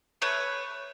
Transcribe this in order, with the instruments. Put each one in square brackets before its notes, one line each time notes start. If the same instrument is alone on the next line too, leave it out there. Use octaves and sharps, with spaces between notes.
[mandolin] A3 B4 C#5